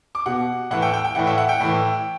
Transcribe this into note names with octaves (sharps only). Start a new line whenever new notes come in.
D6
B2 F#5
A2 E3 F#5
G5
G5
G5
A2 E3 F#5
E5
F#5
G5
A2 E3